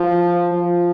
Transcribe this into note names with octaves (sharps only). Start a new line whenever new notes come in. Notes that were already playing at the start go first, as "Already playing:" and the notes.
Already playing: F3
F3